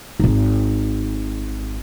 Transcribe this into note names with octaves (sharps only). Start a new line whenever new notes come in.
G#1 D#4